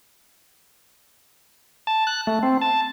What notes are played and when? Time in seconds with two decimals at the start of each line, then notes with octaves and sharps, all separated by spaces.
1.87 A5
2.07 F#6
2.27 A3
2.43 C4
2.61 A5